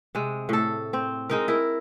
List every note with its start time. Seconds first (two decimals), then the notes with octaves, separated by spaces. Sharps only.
0.15 C3 G#3
0.49 A2 A4
0.93 C4
1.30 G#3 D#4 A#4
1.48 E4 A#4